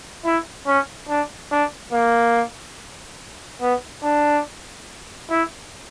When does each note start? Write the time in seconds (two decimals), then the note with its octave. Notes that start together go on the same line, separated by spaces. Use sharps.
0.25 E4
0.67 C#4
1.09 D4
1.51 D4
1.93 A#3
3.62 B3
4.04 D4
5.30 E4